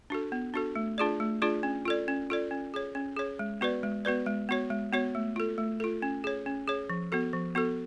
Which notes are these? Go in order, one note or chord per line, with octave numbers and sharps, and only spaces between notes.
D4 F#4 A4
B3
D4 F#4 A4
A3
D4 F4 G#4 D5
A3
D4 F4 G#4 D5
C#4
F4 A4 D5
C#4
F4 A4 D5
C#4
G#4 C#5
C#4
G#4 C#5
G#3
B3 F#4 B4 D5
G#3
B3 F#4 B4 D5
G#3
B3 F#4 C#5
G#3
B3 F#4 C#5
A3
F4 A4
A3
F4 A4
C#4
G#4 C#5
C#4
G#4 C#5
F3
B3 F#4 A4
F3
B3 F#4 A4